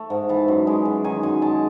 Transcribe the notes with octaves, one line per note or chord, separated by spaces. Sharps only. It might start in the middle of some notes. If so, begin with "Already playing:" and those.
Already playing: A3
G#2
E3 A5
F#2
G#3
F#2
D#3 G#5
F#2 G#5
G#3 A5